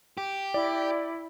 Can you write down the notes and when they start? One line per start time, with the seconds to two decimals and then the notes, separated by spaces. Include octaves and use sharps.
0.18 G4
0.54 E4 D5